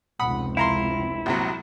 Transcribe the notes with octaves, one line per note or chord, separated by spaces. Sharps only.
F1 C#2 C4 F#5 B5 D#6
E4 F5 A#5 C6
A#1 C3 F#3